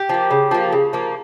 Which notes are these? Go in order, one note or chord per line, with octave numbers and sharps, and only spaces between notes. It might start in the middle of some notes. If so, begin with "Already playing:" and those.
Already playing: G4
F3 A#3
C#3
F3 A#3
C#3
F3 A#3